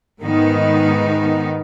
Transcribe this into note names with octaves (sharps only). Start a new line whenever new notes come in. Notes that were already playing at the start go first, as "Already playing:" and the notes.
G#2 D#3 B3 D#4